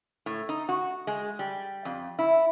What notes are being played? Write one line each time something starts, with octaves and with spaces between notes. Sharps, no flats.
A2
D#4
F#4
G#3
G3
F2
E4